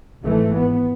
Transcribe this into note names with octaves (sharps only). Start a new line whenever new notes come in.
G#1 E3 A3
B3